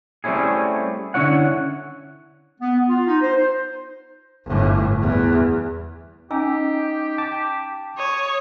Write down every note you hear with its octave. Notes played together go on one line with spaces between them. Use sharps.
G3 A3 C4 C#4 E4 G#4
D3 C#4 E4 C#5 F#5
B3
F4
D#4
C5
C5
G1 A2
E2
C#4 D#4 G4 G#5 E6
G5 A5 D6
C#5 D#6